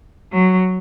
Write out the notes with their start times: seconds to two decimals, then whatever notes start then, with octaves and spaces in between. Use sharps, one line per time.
0.33 F#3